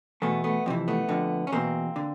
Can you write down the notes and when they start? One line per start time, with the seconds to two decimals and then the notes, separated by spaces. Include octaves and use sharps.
0.22 E2 B2 A3 B3
0.44 A3 B3
0.66 F2 C3 E3
0.88 A3 B3
1.09 F2 D3
1.47 C#4
1.52 E2 B2 A#3 C4
1.96 D3